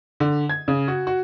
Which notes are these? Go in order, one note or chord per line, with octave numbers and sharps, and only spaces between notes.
D3
G#6
C#3
F#4
F#4